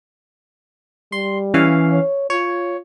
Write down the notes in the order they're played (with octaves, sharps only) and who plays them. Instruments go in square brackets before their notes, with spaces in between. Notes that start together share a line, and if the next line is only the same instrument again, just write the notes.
[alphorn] G3 [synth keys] C6
[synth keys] E3 C#4 F5
[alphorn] C#5
[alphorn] F4 [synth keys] C#5